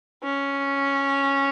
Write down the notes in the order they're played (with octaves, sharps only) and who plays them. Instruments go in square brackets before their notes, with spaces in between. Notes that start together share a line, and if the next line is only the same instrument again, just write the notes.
[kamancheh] C#4